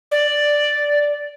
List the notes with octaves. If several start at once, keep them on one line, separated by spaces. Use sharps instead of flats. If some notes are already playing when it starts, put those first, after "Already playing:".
D5